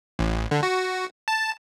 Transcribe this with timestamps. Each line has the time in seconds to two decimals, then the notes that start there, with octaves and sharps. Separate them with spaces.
0.19 A1
0.51 D3
0.63 F#4
1.28 A5